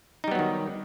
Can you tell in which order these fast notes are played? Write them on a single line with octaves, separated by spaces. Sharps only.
D#4 G3 B3 F#3 D#3